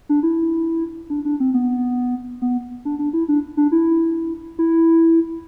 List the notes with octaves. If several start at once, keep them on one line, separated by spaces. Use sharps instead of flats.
D4
E4
D4
D4
C4
B3
B3
D4
D4
E4
D4
D4
E4
E4